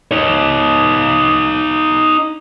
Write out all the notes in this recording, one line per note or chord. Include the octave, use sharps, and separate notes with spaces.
D#4 C#5